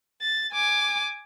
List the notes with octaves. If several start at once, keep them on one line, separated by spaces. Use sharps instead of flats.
A6
G#5 D6